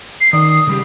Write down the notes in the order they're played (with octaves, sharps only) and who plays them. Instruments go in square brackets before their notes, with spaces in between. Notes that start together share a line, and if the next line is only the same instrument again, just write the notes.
[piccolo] C7
[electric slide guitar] D#3 D5 [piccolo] D#6
[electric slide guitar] C#3 G3 G4